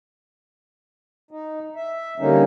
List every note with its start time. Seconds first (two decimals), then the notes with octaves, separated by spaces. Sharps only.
1.31 D#4
1.76 E5
2.20 D3 G3 A#3 C#4 D#4